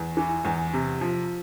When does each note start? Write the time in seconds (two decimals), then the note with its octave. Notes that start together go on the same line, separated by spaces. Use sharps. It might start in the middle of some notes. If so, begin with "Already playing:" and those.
Already playing: E2
0.17 E3
0.45 E2
0.73 C3
1.01 F3